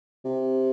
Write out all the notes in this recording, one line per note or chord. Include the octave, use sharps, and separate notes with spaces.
C3